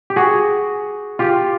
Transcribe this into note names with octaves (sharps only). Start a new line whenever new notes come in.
G4
F#4 G#4
F4 G4